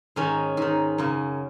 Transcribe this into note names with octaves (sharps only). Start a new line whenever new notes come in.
G#2 D#3 C#4
G#2 D#3
F#2 C#3